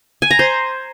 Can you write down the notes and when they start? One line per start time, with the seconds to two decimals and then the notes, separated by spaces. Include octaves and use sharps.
0.22 G#5
0.31 A#5
0.39 C5